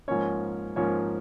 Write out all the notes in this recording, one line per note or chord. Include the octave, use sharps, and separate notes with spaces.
G#2 F3 A#3 C#4 C#5
G#2 F3 A#3 C#4 C#5